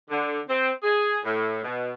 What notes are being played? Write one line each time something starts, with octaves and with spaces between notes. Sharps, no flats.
D3
C4
G#4
A2
B2